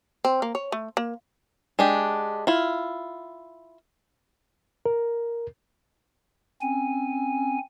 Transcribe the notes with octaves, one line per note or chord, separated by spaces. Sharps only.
C4
A#3
C#5
A3
A#3
G#3 D4 G4
E4 F4
A#4
C4 C#4 G#5